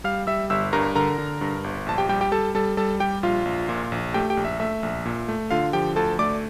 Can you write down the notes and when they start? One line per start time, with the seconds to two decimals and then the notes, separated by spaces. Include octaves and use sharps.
0.04 G3 F5 F6
0.27 G3 E5 E6
0.50 G1 E5 E6
0.73 G2 A#4 A#5
0.95 D3 A#4 A#5
1.18 D3
1.41 G2
1.64 G1
1.86 A#1 A5
1.98 G4 G5
2.09 G3 G4 G5
2.21 G4 G5
2.32 G3 A4 A5
2.55 G3 A4 A5
2.77 G3 A4 A5
3.00 G3 G4 G5
3.23 A#1 F4 F5
3.45 A#1
3.69 A#2
3.92 A#1
4.14 A3 G4 G5
4.30 G4 G5
4.37 A#1
4.45 E5
4.60 A3 E5
4.83 A#1
5.05 A#2
5.28 A3
5.51 D3 F4 F5
5.73 F3 G4 G5
5.96 D2 A4 A5
6.19 A3 D5 D6